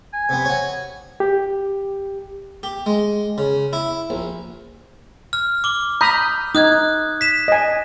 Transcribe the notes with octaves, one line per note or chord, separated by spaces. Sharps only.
G#5
C3 B3
F#4 C#5
G4
G4
G#3
C#3
E4
A#1
F6
D6 G7
A#5 B5 D#6 G6
D#4 D#6 F#6 G#6
B6 E7
D#5 G#5